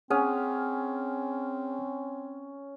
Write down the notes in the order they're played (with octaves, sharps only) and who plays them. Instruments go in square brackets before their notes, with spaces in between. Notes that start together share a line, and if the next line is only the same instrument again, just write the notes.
[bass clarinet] C4 [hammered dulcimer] C#4 [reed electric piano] G#4 F#5 D#6